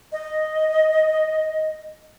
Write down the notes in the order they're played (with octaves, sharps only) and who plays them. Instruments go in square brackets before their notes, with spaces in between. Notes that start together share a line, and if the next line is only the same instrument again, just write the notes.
[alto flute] D#5